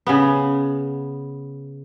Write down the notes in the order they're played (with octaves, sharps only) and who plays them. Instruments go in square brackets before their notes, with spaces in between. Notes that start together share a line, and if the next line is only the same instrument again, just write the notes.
[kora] C#3 B3